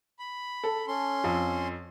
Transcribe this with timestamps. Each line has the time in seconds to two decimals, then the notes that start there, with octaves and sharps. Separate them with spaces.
0.19 B5
0.64 A4
0.88 C#4 C6
1.24 F2